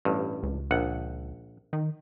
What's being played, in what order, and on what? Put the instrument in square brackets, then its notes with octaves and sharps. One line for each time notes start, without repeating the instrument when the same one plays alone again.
[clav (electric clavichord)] A1 G2
[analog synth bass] C#2
[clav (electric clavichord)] A#1 F#5
[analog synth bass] D#3